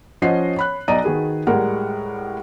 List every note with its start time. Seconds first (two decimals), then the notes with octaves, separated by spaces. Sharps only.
0.22 F3 C#4 C5 D#5 F#5 C7
0.57 C#5 B5 F#6
0.88 B1 D5 D#5 A#5 D#7
1.04 D#3 F#4 G#4 B4
1.47 A2 G3 G#3 A#4 F#5